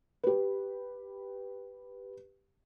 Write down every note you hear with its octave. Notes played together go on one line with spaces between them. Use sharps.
G4 B4